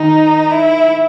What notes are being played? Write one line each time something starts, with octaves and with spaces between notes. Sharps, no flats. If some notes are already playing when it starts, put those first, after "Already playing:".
Already playing: D#3 D#4
E4